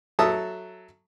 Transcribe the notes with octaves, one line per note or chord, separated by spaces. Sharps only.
F#3 A4 E5 A5 D#6